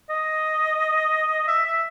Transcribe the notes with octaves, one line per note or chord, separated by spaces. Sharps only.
D#5
E5
E5